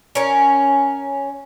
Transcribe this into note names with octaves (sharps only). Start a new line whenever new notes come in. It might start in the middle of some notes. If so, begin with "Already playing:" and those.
C#4 A#4